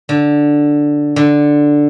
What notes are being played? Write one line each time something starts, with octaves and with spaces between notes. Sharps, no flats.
D3
D3